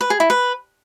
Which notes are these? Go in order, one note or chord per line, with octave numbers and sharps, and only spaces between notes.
B4
G#4
E4
B4